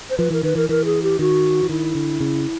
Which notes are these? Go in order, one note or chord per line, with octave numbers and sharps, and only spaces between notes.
C5
F3 B4
E3 A#4
D#3 B4
E3 A#4
E3 A#4
G#4
G4
D#3 F#4
E3
D#3 E4
D3
C#3